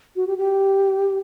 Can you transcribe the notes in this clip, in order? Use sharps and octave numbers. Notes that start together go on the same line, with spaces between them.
F#4
G4
G4